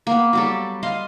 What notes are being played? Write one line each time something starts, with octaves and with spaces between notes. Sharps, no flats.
A#3 B3
F#3 G3 A4
D#5 F5 C6